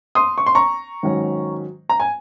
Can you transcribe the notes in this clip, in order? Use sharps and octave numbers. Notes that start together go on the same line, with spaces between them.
C6 D#6
C#6
C6
A#5 C#6
G#2 D#3 F#3 C#4
A#5
G#5